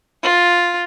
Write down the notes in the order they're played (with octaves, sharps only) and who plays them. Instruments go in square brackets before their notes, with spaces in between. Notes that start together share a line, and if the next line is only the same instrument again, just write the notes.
[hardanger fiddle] F4